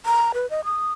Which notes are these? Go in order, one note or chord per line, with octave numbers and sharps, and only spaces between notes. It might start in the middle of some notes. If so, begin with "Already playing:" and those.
A#5
B4
D#5
D#6